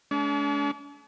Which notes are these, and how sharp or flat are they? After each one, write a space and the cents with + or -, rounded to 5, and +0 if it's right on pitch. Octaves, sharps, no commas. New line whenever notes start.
G#3 +45 D4 -45